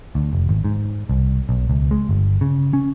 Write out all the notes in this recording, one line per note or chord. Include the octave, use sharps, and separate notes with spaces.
D2
F1
G#1
G#2
C2
B1
C#2
G#3
G1
C#3
C#4